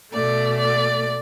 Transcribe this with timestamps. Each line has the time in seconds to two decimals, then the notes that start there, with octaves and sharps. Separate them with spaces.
0.10 B2 A3 D5
0.57 D5